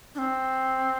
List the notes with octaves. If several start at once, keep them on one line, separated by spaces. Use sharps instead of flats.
D4
C4